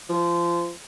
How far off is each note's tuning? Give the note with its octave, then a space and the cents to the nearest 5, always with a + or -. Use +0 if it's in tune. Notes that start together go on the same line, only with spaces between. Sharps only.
F3 -25